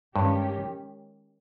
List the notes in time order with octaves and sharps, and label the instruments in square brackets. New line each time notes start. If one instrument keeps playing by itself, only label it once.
[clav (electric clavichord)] G2 [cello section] D#3 G#3 C#4 G4